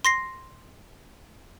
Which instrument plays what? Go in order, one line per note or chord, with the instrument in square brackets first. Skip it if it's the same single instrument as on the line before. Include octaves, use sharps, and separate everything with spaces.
[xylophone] C6 A#6 C7